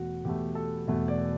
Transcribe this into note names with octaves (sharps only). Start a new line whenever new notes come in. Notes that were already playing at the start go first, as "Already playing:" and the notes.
Already playing: E1 E2 B2 A3 F#4
E1 E2 B2 A3 G4
A4
E1 E2 B2 A3
D5